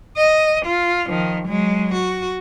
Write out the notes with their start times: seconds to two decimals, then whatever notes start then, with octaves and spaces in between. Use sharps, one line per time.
0.17 D#5
0.65 F4
1.08 D#3 F3
1.47 F#3 G#3
1.94 F#4